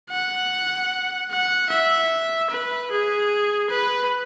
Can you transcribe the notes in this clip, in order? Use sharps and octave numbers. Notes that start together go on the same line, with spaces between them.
F#5
F#5
E5
B4
G#4
B4